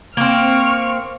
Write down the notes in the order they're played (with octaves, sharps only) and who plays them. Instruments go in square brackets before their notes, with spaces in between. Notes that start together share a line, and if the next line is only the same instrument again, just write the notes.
[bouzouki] A#3 C4 [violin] C#6 F6